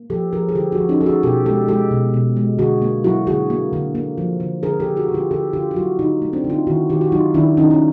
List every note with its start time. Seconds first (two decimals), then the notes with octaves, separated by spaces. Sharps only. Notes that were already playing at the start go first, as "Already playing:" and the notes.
Already playing: A#3
0.10 F3 G4 A4
0.33 F3 G#4 A#4
0.49 G#4
0.55 D3 G4 A4
0.72 F#4 G#4
0.78 F3
0.89 C#4 D#4
1.00 F3 A4
1.06 F#4 G#4
1.23 B2 G4 A4
1.46 G#3 G4 A4
1.68 G#3 G4 A4
1.91 B2
2.14 B2
2.37 G#3
2.59 D3 F#4 G#4
2.82 A#3
3.04 F#3 E4 F#4
3.27 D3 F#4 G#4
3.50 A#3
3.73 D3
3.95 A#3
4.18 F3
4.40 D3
4.63 D3 G#4 A#4
4.80 G4 A4
4.86 D3
4.97 F#4 G#4
5.08 D3
5.14 F4 G4
5.31 D3 G4 A4
5.53 D3 F4 G4
5.71 F4
5.76 F#3 E4 F#4
5.99 D3 D#4 F4
6.22 A3
6.33 C4 D4
6.44 D3
6.50 D#4 F4
6.67 D#3 E4 F#4
6.90 D#3 F4 G4
7.01 F#4
7.12 F#3 D#4 F4
7.34 D#3 D4 E4
7.57 D#3 C#4 D#4
7.71 C#4